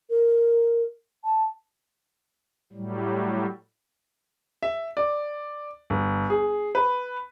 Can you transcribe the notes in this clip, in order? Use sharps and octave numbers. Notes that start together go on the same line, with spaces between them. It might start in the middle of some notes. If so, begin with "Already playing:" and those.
A#4
A5
A2 F#3 G3
E5
D5
G1
G#4
B4